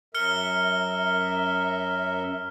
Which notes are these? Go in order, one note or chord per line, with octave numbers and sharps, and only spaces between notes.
F#2 A#4 E5 F6 C#7 G7